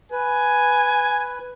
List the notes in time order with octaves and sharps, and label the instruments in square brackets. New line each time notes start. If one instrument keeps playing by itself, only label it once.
[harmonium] B4 [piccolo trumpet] G#5